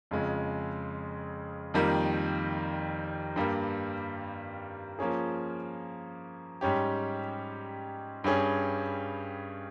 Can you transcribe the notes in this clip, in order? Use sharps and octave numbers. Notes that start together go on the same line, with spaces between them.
F2 C#3 G#3
F2 D#3 G3 A#3
G2 G3 A#3
F3 A#3 C#4 G#4
G#2 G3 C#4 G4
G2 G3 C#4 G#4